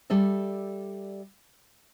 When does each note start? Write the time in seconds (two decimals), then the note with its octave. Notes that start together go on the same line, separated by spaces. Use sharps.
0.10 G3 A4 D5 E5